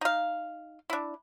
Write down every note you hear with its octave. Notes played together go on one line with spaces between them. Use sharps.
D#4 F5
D4 E4